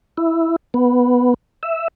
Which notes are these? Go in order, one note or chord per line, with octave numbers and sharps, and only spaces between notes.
E4
B3
E5